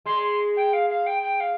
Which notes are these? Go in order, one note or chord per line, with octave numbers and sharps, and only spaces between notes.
G#3 C6
C6
G5
F5
F5
G5
G5
F5